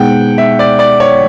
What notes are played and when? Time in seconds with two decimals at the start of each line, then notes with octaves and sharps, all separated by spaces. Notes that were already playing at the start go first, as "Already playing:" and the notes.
Already playing: B2 G#3 B3 D#4 G#4 F#5 G5
0.38 E5
0.59 D5
0.79 D5
1.00 C#5